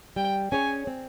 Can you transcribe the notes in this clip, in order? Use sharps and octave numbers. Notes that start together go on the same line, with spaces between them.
G3 G5
C#4 G#4 C#5 G#5
C4